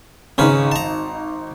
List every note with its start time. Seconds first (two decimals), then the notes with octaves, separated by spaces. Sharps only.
0.38 G#1 C#3 C#4 D#4 B4
0.72 A5 A#5